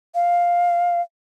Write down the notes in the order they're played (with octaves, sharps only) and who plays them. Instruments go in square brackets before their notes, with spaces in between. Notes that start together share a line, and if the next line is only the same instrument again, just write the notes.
[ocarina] F5